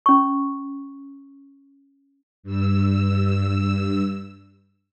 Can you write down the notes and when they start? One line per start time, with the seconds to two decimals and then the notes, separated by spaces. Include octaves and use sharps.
0.06 C#4 C#6
2.43 G2 E6